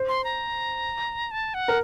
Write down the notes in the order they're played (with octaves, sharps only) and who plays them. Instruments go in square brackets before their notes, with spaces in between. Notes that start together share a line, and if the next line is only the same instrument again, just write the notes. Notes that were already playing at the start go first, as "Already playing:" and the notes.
Already playing: [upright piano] C5
[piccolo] C6
A#5
A5
F#5
[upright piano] A#4